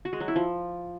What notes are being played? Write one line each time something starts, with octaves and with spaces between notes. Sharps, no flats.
F#4
G#3
F#3
E4
F3